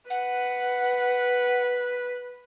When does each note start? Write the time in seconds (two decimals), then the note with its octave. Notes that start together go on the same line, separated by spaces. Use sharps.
0.10 B4 F#5